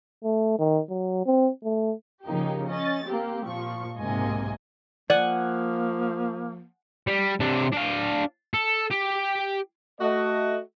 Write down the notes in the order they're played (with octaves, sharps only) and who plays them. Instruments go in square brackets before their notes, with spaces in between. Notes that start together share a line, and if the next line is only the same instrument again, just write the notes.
[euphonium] A3
D#3
F#3
C4
A3
[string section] C#3 F3 A#3 D#4 G4
C#4 D#5 A6
A#3 C4 G4
A#2 F3 C#6
B1 G#2 C3 A#3 D#5 G#5
[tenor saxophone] F3 [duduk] A#3 [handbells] D5 [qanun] F#5 G#5
[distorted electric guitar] G3
C3 D4
D4 F5
A4
G4
[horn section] A3 F#4 D#5